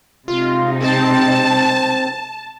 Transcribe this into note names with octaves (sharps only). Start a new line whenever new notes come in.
C3 G#3 D#4 F4
C4 A5